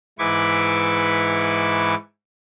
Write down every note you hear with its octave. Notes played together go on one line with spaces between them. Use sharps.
G#2 E3 E4 B4 C#6 D6